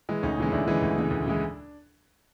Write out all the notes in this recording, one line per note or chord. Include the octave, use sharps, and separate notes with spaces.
E3 G#3
D2 C#4 D#4
C#3 E3 G#3
D2 D4 E4
C#3 E3 G#3
D2
C#3 E3 G#3
D2
C#3 E3 G#3